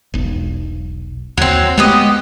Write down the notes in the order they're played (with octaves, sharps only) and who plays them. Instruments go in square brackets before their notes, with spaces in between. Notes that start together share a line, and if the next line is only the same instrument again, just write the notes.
[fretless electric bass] E1 B1
[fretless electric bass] D#2 [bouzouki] F#3 C4
[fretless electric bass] G#3 A3 [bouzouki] B3 G4 D#5